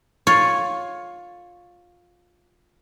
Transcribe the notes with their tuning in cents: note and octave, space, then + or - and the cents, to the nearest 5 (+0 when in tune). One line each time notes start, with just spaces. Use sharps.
F4 +15 C#5 +0